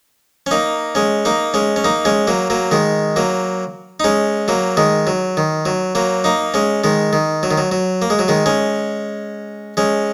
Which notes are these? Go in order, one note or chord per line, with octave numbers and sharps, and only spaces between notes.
C#4
A#3 D#4
G#3 C#4
A#3 D#4
G#3 C#4
C#4
A#3 D#4
G#3 C#4
F#3 A#3
F#3 A#3
D#3 G#3
F#3 A#3
D#4
G#3 C#4
F#3 A#3
D#3 G#3
F#3
D#3
F#3
F#3 A#3
A#3 D#4
G#3 C#4
D#3 G#3
D#3
F#3
D#3
F#3
F#3
A#3
G#3
F#3
D#3 G#3
G#3 C#4
G#3 C#4